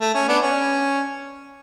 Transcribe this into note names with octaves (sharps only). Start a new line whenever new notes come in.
A3
C#4
B3 D4
C#4